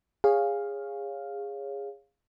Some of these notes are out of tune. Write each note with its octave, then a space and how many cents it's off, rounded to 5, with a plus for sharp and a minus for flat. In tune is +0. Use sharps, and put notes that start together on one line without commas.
G#4 -20 C#5 +0 F5 +5